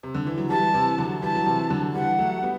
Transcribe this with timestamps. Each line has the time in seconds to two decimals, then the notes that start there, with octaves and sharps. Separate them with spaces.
0.03 C3
0.14 D3
0.26 E3
0.38 F#3
0.50 E3 G3 A5
0.74 C3 E3
0.98 D3 F#3
1.22 E3 G3 A5
1.35 F#3
1.46 C3 E3
1.70 D3 F#3
1.94 E3 G3 F#5
2.19 F#3 A3
2.43 G3 B3